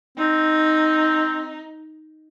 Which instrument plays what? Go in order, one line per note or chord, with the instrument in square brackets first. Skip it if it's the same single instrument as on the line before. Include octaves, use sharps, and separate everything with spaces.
[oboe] C4 [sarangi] D#4